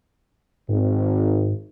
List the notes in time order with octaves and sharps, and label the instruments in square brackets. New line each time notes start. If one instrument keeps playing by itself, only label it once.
[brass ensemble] G#1 [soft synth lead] G#2